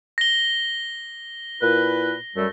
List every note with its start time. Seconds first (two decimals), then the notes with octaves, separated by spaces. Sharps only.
0.18 A#6 G7
1.62 A#2 E4 B4
2.36 F#2 G3 A3